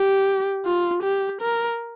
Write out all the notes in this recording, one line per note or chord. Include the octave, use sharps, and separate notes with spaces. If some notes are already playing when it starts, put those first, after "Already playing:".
Already playing: G4
F4
G4
A#4